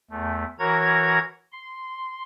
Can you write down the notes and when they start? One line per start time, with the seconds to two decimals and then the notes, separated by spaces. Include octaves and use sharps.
0.11 E2 A3
0.59 E3 F#4 A#4 C#5 A#5 G#6
1.52 C6